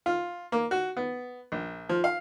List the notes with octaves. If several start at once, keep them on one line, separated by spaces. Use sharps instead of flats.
F4
A#3
F#4
B3
A#1
F3
F5